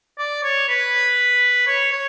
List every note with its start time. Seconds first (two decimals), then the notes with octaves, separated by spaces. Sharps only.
0.18 D5
0.43 C#5
0.69 B4
1.67 C#5
1.92 C#5